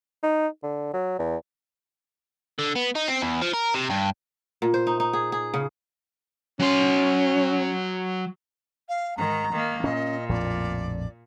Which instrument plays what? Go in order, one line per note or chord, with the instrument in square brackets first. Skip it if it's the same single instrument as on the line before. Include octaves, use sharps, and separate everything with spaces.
[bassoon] D#4
D3
F#3
E2
[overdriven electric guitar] D3
B3
D#4
C4
E2
F3
A#4
C3
G2
[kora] A#2
C5
D#4
D#4
G#4
G#4
C#3
[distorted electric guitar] F#3 C6 [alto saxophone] C#4
[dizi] F5
[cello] G#2 D#3 [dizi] A#5
[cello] D#3 A#3
[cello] A#2 [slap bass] C#4 [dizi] D#5
[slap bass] A#1 F2 A2 [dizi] D5